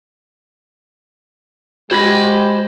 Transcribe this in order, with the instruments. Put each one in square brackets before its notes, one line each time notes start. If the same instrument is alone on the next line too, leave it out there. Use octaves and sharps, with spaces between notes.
[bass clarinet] G#3 [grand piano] F#4 G#6 A#6 [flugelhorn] G4 [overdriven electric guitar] C5 B5